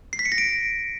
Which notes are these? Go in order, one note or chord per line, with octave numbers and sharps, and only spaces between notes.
C7
B6
C#7
A#6
D7